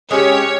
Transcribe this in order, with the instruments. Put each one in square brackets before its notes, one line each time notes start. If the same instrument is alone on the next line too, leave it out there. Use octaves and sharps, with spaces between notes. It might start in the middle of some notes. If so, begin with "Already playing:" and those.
[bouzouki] G#3 C#4 G4 [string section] C#5